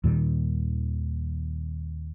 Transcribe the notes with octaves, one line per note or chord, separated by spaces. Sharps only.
D#2 A#2 D#3 G3